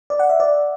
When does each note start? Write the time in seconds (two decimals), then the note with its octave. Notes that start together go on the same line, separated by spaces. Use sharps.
0.10 D5
0.19 F#5
0.29 E5
0.40 D5